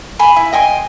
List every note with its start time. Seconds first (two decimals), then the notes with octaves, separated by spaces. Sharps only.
0.19 G#5 B5 C6
0.36 E4
0.53 D#5 G5 G#5 C6